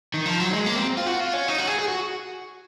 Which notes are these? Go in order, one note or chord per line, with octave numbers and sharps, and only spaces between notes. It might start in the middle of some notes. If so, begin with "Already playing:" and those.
D#3
F3
F#3
G#3
A#3
C4
F4
F#4
F4
C#4
D#4
F#4
G#4
G#4
F#4